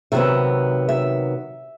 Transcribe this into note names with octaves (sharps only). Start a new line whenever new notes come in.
C3 D#3 F#3 B3 E5
E5